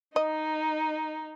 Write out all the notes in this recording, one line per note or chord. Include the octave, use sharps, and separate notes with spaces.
D#4 D#5